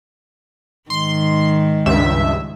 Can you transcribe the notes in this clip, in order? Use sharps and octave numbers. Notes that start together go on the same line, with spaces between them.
G#2 D#3 C6
C#2 G2 E5